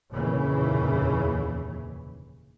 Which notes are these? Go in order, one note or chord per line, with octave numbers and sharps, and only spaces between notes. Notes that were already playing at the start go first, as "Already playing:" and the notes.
F1 D#2 A#2 C#3 E3